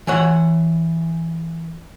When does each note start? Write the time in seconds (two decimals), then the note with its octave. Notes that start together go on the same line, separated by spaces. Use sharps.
0.07 E3 C#5 F#5